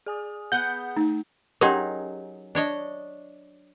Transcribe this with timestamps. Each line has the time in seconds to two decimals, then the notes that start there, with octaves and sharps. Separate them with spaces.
0.06 G#4 G#5 D#6
0.52 B3 F#5 G6
0.97 A3 D#4
1.61 F#3 C#4 D#4 G4 G#4 A#4
2.55 D4 C#5 D#5